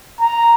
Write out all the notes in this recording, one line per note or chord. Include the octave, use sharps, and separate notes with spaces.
A#5